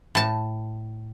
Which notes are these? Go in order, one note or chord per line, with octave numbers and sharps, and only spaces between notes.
A2 A5